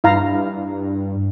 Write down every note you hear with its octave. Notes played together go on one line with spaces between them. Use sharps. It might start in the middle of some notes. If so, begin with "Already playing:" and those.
G2 E4 F5 A#5